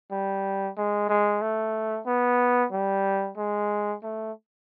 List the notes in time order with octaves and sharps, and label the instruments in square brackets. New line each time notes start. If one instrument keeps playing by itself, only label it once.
[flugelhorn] G3
G#3
G#3
A3
B3
G3
G#3
A3